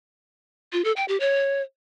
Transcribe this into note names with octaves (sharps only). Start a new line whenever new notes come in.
F4
A4
G5
G4
C#5